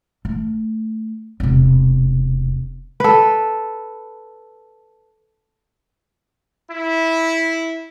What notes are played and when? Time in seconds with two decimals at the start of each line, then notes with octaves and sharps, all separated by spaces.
0.25 A3
1.40 E1 C3
3.00 A4 B4
6.69 E4